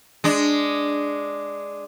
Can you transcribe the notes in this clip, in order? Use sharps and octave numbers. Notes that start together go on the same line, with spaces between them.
G#3 D4